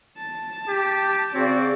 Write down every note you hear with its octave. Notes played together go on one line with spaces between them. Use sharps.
A5
G4
C#3 C4 F#4 D5